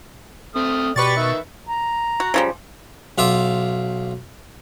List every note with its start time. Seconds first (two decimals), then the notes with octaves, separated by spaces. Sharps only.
0.56 A3 C4 D#6 F6
0.96 B2 G4 B4 D5 C#6 A6
1.17 D#3 E5
1.67 A#5
2.20 F#4
2.34 C#3 F3 G3
3.18 B1 F4 E5 D6